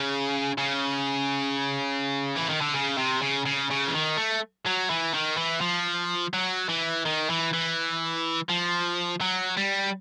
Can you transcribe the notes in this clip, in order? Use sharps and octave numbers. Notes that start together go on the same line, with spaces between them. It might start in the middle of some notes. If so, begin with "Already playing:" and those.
Already playing: C#3
C#3
E3
D#3
D3
C#3
C3
C#3
C#3
C#3
E3
D#3
A3
F#3
E3
D#3
E3
F3
F#3
E3
D#3
E3
E3
F3
F#3
G3